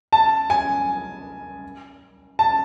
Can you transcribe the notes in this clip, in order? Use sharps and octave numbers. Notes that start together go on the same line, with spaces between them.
A5
G#5
A5